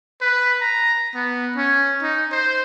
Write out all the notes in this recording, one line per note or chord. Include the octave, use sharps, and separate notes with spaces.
B4
A#5
B3
C#4
D#4
C5